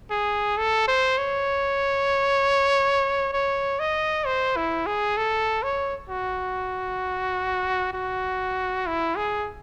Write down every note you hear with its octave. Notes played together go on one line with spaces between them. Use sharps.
G#4
A4
C5
C#5
C#5
D#5
C5
E4
G#4
A4
C#5
F#4
F#4
E4
G#4